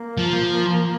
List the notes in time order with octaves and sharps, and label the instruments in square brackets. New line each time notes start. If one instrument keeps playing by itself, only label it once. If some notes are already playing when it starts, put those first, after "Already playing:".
Already playing: [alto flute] A#3
[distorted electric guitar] F3